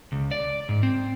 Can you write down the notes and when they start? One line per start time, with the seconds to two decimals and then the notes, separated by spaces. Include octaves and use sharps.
0.12 C#2
0.31 D5
0.69 G#2
0.83 C4